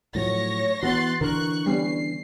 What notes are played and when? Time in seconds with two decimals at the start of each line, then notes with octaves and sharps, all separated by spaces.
0.15 A2 F3 F#3 C#5 C#6 A#6
0.83 E3 B3 F#4 C6 F#6 A6
1.21 D3 E3 A#4 C#6 F#6
1.66 G3 B3 C#4 C7